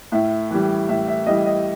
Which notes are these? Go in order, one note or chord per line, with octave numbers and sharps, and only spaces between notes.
A2 E5
E3 G3
A2 E5
E5
E3 G3 D#5
D#5